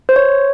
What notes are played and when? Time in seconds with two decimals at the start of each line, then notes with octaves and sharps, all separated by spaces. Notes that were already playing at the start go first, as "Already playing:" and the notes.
0.09 C5
0.16 C#5